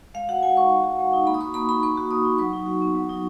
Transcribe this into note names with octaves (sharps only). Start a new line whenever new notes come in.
G#3 F5
F#4 F#5
G#3 G#5
D#4 C#6
G#3
F#4
G#3
D#4
A#3 B5
D#6
F#4 C#6
A#3 B5
D#4 B5
A#3 C#6
F#4
A#3 D#6
D#4
F#3 C#6
D#4
F#4
B3
F#3
D#4